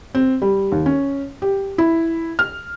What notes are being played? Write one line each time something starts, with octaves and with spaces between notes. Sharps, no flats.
C4
G3
D#2
C#4
G4
E4
F6